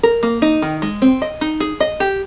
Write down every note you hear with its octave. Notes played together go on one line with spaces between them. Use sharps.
A#4
A#3
D#4
D#3
G#3
C4
D#5
D#4
G#4
D#5
G4